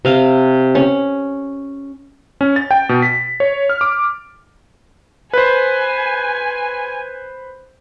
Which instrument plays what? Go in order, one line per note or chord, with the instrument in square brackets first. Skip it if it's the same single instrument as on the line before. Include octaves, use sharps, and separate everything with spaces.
[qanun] C3 F5
C#4
[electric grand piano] C#4
A6
G5
B2
B6
C#5
F6
D6
[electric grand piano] B4 C5 [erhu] G#5